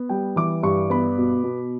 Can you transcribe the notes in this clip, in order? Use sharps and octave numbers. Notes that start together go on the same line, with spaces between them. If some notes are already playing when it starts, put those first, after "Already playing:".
Already playing: B3
G3 G5
E3 D6
G2 C#6
B3 B5
B2
B2